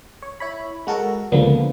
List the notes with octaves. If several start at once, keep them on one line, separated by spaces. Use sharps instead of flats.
C#5
E4 C#5 B5
G#3 F#4 A4 A#4
C#2 D3 F3 A#3 B3